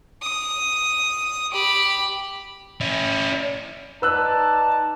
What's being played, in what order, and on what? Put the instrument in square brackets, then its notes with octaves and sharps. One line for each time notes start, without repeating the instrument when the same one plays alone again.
[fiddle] D#6
G4 B5
[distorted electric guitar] C#4 E4
[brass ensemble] D#4 D5 A5 [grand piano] B4 E6 F#6